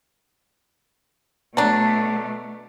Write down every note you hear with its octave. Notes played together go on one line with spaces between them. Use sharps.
B2 F#3 A3 D4